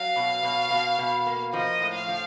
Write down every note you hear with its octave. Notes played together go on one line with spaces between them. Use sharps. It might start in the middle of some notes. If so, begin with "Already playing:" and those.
Already playing: F#3 F5
B2
B2
B2
B2
A#3
F3 D#5
A2
F5
F3